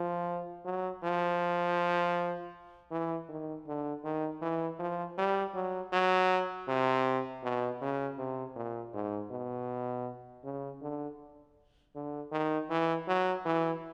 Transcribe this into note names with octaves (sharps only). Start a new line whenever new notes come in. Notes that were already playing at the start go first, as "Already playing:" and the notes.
Already playing: F3
F#3
F3
E3
D#3
D3
D#3
E3
F3
G3
F#3
F#3
C3
B2
C#3
C3
A#2
G#2
B2
C#3
D3
D3
D#3
E3
F#3
E3